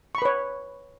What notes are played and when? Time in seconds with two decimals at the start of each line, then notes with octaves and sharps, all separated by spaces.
0.15 C#6
0.18 B5
0.22 B4
0.25 C#5